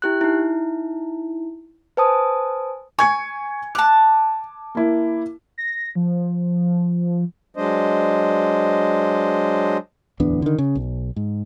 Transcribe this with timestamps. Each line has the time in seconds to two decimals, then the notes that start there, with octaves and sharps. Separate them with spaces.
0.02 E4 G4 F#6
0.21 D#4 E4
1.97 B4 C5 G#5 A5 D#6
2.99 G#5 C#6 G#6 C#7
3.75 A5 D6 F#6
4.75 A#3 E4
5.58 A#6
5.95 F3
7.57 F#3 G#3 D4 C5 D#5
10.20 D1 E2 B3 D4
10.42 D3 D#3
10.58 C#3
10.75 B1
11.16 G#2